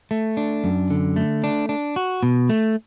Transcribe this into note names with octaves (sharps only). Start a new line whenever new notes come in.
A3
D4
F#2
D3
A3
D4
D4
F#4
B2
A3